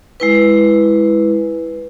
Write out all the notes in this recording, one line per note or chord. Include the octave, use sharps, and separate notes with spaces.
G#3 E4 B4